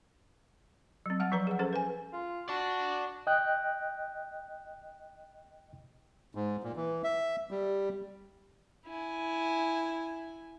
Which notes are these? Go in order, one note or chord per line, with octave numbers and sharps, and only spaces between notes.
F#3 C4
G3 F#5 A5
F3 F#3 B4 A#5
G#4 F#5
C#4 G#4 A4 C5
B4 G#5
F4
F#4 D5 A5
D#5 G5 F#6
G#2
A#2
E3
E5
G3
E4 G#5